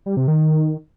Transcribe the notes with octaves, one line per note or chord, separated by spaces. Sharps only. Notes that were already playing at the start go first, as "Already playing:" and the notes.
G3
C3
D#3